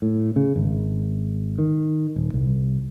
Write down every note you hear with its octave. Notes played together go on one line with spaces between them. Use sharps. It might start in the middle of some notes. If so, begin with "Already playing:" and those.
A2
C#3
G#1
D#3
D#1
C2